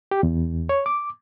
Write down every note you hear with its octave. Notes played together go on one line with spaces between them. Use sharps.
G4
E2
C#5
D6